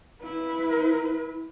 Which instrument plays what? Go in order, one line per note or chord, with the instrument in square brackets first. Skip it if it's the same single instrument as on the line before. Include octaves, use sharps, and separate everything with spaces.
[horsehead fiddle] E4 B4